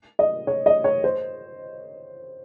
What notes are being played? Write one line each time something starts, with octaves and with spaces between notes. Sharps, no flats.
D#5
C#5
D#5
C#5
C5